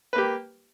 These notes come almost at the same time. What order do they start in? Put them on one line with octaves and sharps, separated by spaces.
B4 A#3 G4